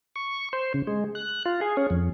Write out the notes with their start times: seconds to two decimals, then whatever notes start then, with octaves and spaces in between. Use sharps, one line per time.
0.16 C#6
0.53 C5
0.74 C#3
0.87 G#3
1.15 F#6
1.46 F4
1.61 G#4
1.77 C#4
1.90 F2